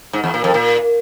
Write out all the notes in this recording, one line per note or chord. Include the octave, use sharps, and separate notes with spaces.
G#2
E2
A#2
F2
A#2